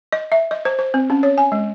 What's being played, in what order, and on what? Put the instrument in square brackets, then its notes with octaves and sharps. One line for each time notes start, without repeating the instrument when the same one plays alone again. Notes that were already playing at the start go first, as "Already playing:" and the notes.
[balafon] D#5
E5
D#5
C5
C5
C4
C#4
C#5
G#5
G#3